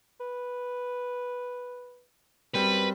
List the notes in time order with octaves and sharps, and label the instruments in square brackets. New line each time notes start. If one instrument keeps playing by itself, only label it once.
[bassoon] B4
[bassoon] F#2 [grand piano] G3 C4 [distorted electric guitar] B4